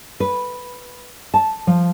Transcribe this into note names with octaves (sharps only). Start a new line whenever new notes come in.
B4
A5
F3